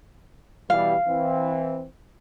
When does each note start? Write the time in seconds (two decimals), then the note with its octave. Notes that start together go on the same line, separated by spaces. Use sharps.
0.70 B2 E3 G3 F5
1.07 E3 C4